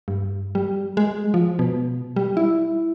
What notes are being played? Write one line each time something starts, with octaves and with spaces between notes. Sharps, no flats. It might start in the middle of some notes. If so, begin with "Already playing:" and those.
G2
G3
G#3
F3
B2
G3
E4